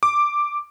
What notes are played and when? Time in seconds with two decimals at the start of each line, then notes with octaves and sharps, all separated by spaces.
0.03 D6